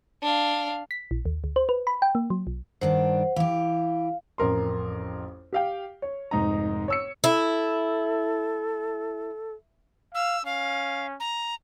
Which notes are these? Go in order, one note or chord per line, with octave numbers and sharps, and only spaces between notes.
D4 F5
B6
A#1
D#2
D2
C5
B4
B5
G5
A#3
F#3
B1
G2 D#3 D4 C5 F#5
E3 G4 F5
A1 F2 A#4 C6
G4 F5 G5
C#5
F1 G#2 D#4 A#5
C#5 E6 C#7
E4 A4
F5 E6
C#4 F5
A#5